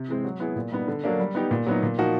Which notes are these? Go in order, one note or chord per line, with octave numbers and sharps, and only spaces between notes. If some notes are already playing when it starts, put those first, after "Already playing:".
Already playing: C3
E3 G#3 C4
F#3
B3 E4 G#4
A#2
G3 B3 D#4
D3
F#3 A#3 D4
G3
B3 D#4 G4
A#2
F#3 B3 D#4
A#2
F3 A#3 D#4 F#4